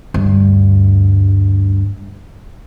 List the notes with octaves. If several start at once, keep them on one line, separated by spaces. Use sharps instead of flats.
D2 G2